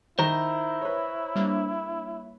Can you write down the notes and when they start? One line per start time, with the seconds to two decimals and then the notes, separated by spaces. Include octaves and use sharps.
0.19 D#3 E4 C5 A#5
0.82 B4 C#5
1.36 G3 A#3 D4